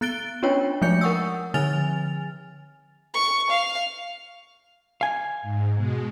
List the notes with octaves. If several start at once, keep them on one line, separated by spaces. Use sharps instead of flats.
B3 F#6 A6 D7 G7
C#4 D4 F4 C#5 G5
F3 G#3 A3 G#5 G6 C#7
A#4 F#5 C#6 D#6 E6
D3 F3 G#5 F6 A6 F7
C#6
F5
F5 G#5
G#2
B2 G#3